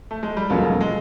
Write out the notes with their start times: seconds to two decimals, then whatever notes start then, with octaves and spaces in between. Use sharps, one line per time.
0.11 A3
0.23 G#3
0.37 G3
0.50 E1 D#2 C#3 F3 F#3 A3
0.81 G#3